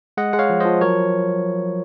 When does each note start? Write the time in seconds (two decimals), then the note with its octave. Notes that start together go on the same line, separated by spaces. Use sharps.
0.17 G#3 D#5 F#5
0.33 G#3 F#5
0.39 C#5 F5
0.50 F3
0.60 F3 C5 D#5
0.81 F#3 A#4 C#5